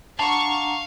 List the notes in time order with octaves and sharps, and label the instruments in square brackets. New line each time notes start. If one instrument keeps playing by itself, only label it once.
[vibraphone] D4 F#5 A#5 [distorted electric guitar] F5 [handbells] A5 [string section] C#6